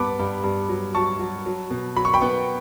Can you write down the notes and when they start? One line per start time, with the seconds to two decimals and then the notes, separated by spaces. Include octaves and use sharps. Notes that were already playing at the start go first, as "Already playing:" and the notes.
Already playing: G2 B3 A5 B5 D6
0.19 G2
0.44 G2
0.69 F#3
0.95 F#3 A5 C#6
1.20 F#3
1.46 F#3
1.71 B2
1.96 F#3 B5
2.05 C#6
2.14 G5 B5
2.22 B3